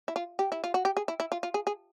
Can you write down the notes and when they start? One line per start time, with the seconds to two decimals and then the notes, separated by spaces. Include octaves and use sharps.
0.08 E4
0.16 F4
0.39 G4
0.52 E4
0.64 F4
0.74 F#4
0.85 G4
0.97 G#4
1.08 E4
1.20 E4
1.32 F4
1.43 F4
1.54 G#4
1.67 G#4